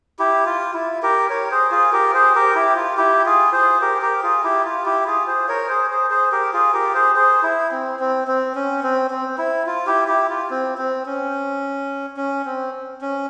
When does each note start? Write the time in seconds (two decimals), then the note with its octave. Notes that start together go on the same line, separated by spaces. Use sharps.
0.19 E4 G4
0.46 F4
0.74 E4
1.03 G4 A#4
1.30 A#4 C#5
1.51 G#4 C5
1.71 F4 G#4
1.93 G4 A#4
2.14 G#4 C5
2.35 G4 A#4
2.55 E4 G4
2.76 F4
2.97 E4 G4
3.26 F4 G#4
3.53 G#4 C5
3.81 G4 A#4
4.01 G4 A#4
4.22 F4 G#4
4.44 E4 G4
4.65 F4
4.85 E4 G4
5.06 F4 G#4
5.27 G#4 C5
5.48 A#4 C#5
5.69 G#4 C5
5.90 G#4 C5
6.10 G#4 C5
6.32 G4 A#4
6.53 F4 G#4
6.73 G4 A#4
6.94 G#4 C5
7.15 G#4 C5
7.43 E4
7.72 C4
8.00 C4
8.28 C4
8.55 C#4
8.83 C4
9.11 C4
9.38 E4
9.67 F4
9.87 E4 G4
10.08 E4 G4
10.29 F4
10.50 C4
10.78 C4
11.06 C#4
12.17 C#4
12.45 C4
13.01 C#4